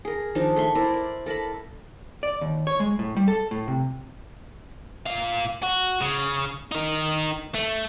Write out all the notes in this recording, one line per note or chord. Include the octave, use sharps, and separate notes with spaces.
G#4 A#4
D#3 F3 D4 D#4
A3 E5 C6 C#6
E4 A#4 C5 D5
D5
A4 A#4 A5 B5
D5
D#2
C#5
G#3
A2
G3
A4
A2
C3
A#2 F5
F#4
C#3
D#4 A#4
A3